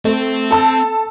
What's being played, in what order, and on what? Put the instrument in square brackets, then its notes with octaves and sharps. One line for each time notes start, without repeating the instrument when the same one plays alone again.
[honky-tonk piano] A3 [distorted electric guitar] C4
[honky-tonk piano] A4 A5 E6